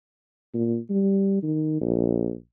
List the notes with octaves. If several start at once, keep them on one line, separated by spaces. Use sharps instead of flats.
A#2
G3
D#3
A#1